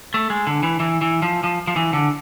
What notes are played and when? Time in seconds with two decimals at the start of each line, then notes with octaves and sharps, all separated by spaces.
0.14 A3
0.30 G#3
0.47 D3
0.63 E3
0.80 E3
1.01 E3
1.22 F3
1.44 F3
1.67 F3
1.76 E3
1.93 D3